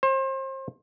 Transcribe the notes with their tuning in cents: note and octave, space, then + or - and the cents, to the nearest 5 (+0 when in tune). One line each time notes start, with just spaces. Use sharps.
C5 +35